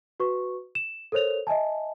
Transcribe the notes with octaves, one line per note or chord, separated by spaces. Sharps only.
F#4 B4 C#6
E7
A4 A#4 C5 C#5 F7
D#5 E5 G#5 A5